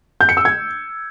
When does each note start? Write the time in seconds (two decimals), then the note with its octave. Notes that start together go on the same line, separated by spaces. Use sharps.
0.21 G6
0.29 C#7
0.37 E6
0.45 G#6